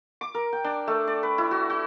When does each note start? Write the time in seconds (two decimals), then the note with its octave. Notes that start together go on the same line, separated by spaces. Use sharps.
0.21 D6
0.34 A#4
0.53 G5
0.64 D4
0.87 A3
1.07 D5
1.23 B4
1.38 E4
1.51 F#4
1.70 F#4